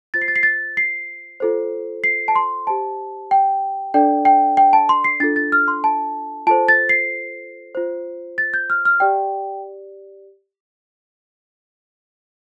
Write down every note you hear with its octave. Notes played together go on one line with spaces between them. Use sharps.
F4 C5 A6
C7
A6
C7
A6
C7
F4 A4 C5
C7
A5
C6
G4 C5 A5
G5
D4 A4 D5 G5
G5
G5
A5
C6
C7
D4 F4 A4 A6
A6
F6
C6
A5
F4 A4 C5 A5
A6
C7
F4 C5
A6
G6
F6
F6
G4 D5 G5